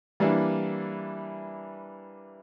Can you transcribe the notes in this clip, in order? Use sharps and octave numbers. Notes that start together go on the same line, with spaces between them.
E3 G3 A#3 D4 E4